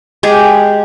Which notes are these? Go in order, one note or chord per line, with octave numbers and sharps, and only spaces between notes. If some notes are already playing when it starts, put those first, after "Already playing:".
G#3 G4 G#4